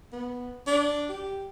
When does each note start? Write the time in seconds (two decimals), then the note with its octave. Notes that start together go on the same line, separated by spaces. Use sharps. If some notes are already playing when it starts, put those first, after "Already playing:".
0.13 B3
0.67 D4
1.09 G4